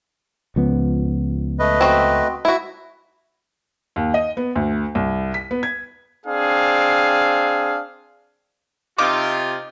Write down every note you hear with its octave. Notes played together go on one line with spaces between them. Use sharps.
C#2 F3 B3
A3 B4 D#5
C4 F#4
E4 F#4
D#2
D#5
B3
D2
C2
B6
B3
G#6
C4 D4 G#4 F5
C3 D#4 F4 D6